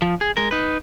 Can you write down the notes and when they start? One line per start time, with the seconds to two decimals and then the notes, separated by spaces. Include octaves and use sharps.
0.02 F3
0.21 G#4
0.37 G#3 A#4
0.51 D#4 B4